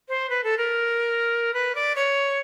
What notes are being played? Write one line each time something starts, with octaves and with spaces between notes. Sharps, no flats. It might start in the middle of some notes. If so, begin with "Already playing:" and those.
C5
B4
A4
A#4
B4
D5
C#5